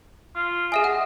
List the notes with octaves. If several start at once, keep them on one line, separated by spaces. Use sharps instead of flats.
F4
G#4 D#5 E5 G#5
F#5